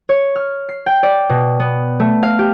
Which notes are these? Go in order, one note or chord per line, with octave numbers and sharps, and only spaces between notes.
C#5
F6
C7
G5
D5
B2
B3
A3
F5
G4